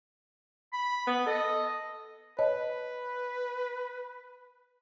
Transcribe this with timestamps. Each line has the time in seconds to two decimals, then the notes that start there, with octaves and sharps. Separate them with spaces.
0.73 B5
1.07 B3
1.27 A4 D#5
2.39 B4 C#5 D#5 A5